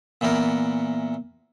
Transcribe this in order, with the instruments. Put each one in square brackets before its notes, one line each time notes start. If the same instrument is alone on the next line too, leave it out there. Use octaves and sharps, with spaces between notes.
[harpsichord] A#2 E3 B3 A#4